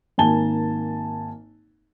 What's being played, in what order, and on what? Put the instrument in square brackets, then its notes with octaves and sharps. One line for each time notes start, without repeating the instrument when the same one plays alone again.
[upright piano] G#1 A#3 G#5 A5 G7